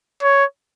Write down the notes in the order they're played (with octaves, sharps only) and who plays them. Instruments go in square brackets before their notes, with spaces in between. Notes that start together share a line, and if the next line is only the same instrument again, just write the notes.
[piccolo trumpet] C#5